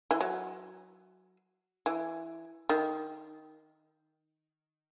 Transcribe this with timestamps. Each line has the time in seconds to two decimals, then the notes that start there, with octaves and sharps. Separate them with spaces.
0.11 E3
0.21 F#3
1.86 E3
2.69 D#3